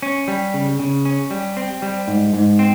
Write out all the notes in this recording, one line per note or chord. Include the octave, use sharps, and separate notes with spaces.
C#4
G3
C#3
C#3
C#4
G3
C4
G3
G#2
G#2
C4